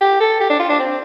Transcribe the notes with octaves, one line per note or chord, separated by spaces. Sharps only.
G4
A4
G4
D4
F4
D4
C4